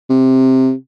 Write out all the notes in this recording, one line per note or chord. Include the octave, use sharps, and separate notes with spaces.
C3